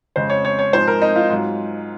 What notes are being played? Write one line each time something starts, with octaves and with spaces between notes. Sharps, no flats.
F2 C#3 G#3 C5
C#5
C#5
C#5
G#2 F3 G#3 C5
A#4
D#4
F4
G#2 F#3